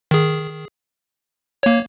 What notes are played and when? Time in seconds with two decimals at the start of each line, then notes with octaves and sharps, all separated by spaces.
0.11 D#3 G#4
1.63 A#3 C#5